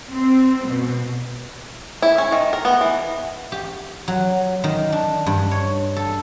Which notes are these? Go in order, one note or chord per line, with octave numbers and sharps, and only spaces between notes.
C4
B2
E4
C#4
D#3
A#4
B3
E3
G4
F#3
D#3
D4
G2
C#5
A4